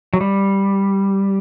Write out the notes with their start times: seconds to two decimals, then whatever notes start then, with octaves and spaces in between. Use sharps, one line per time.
0.14 F#3
0.21 G3